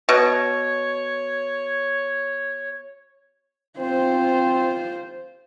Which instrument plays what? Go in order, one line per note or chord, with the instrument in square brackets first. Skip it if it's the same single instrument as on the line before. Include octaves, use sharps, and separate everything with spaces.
[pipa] B2 [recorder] C#5
[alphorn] C4 [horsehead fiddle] F4 C5